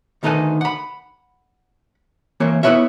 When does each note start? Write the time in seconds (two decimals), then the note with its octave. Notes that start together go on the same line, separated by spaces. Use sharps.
0.23 D2 D#3 D#4 A4 B4 G#5
0.61 F#5 B5
2.40 E3 A#3 C4 C#5
2.63 B3 E4 F4 B4 C#5 E5